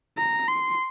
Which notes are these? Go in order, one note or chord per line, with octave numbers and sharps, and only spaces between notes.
A#5
C6